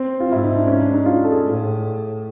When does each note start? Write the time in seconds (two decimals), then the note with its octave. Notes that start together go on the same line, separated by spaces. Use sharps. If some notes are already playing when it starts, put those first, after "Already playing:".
Already playing: C4
0.20 F4
0.29 G#2 E4
0.43 D#4
0.55 D4
0.67 C#4
0.80 D4
0.93 D#4
1.06 F4
1.24 A4
1.32 G#4
1.45 A2